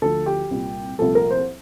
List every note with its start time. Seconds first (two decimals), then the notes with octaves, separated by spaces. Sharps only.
0.02 D2 D3 F3 A3 A4
0.26 G4
0.51 C2 A#2 G3
0.99 C2 A#2 F3 A3 A4
1.15 A#4
1.31 C5